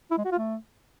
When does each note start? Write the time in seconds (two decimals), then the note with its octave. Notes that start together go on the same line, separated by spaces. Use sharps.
0.11 E4
0.18 G#3
0.25 F#4
0.32 F4
0.38 A3